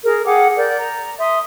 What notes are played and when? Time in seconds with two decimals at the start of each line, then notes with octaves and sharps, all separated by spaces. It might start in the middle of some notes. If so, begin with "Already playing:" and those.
0.04 G#4 A#4
0.25 G#4 F#5 G5 D6
0.57 A#4 D5 G6
0.78 A#5
1.19 E5 C6 D#6